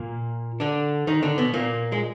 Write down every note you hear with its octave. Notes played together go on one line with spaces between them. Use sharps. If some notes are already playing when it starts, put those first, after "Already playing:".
Already playing: A#2 A#3
D3 D4
D#3 D#4
D3 D4
B2 B3
A#2 A#3
G#3